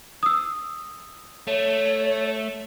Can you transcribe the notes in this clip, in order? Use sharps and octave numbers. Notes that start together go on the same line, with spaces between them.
D#6 E6
A3 C#5